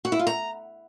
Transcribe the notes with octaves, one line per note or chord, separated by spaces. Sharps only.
F#4
E4
F4
A#5